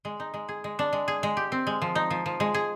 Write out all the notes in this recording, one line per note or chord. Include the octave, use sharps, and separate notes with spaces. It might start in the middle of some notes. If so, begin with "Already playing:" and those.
G#3
D#4
G#3
G#4
G#3
D4
G#3
G#4
G#3
G4
C4
G#3
F3
D#4
F3
F3
G#3
G#4